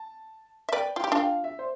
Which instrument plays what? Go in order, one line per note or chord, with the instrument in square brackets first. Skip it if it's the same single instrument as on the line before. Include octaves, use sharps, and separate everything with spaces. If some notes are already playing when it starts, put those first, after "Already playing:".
Already playing: [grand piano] A5
[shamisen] E5
[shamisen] B4 D5 [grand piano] G5
[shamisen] F4 [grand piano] G5
[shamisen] G4
[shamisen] D4 F4 [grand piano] G5
[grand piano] F5
E5
C5